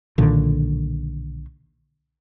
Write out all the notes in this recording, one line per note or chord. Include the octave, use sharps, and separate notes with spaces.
B1 A#2 D3 D#3